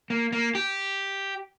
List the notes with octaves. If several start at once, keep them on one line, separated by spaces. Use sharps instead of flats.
A#3
A#3
G4